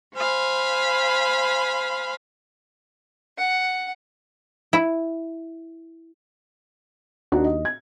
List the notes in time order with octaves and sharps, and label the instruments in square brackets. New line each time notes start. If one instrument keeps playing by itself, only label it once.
[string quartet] C5 F5 G#5 B5
F#5
[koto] E4
[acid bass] D#2 [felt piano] D4 D#4 F#4
[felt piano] D#5
G#6